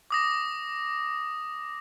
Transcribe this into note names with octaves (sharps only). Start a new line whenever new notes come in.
D6 D#6 A#6